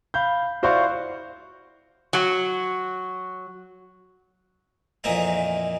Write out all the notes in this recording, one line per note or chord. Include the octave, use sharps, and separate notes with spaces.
F5 B5 G6
E4 F#4 C5 D5 F5 C#6
F#3 F#4
F2 A#2 E3 D#4 E5 A#5